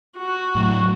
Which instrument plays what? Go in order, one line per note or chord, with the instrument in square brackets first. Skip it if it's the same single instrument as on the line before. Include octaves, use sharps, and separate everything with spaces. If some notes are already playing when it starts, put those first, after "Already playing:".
[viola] F#4
[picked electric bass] A2 F#3